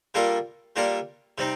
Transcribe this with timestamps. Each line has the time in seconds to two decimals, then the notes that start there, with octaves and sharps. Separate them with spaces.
0.14 G3 A#3 D4 F4 A4
0.76 G3 A#3 D4 F4 A4
1.38 C3 G3 C4 D#4